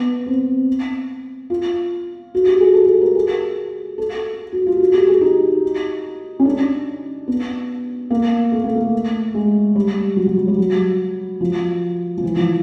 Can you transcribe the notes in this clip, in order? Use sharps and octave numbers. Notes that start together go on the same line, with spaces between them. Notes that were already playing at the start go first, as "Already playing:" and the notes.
Already playing: B3
C4
F4
F#4
G4
G#4
A4
A4
A#4
G#4
A4
F#4
F4
G4
F#4
G4
G#4
D#4
C#4
D4
B3
A#3
A3
A#3
A3
G#3
G3
F#3
F#3
F#3
G3
F#3
F3
F3
E3
F3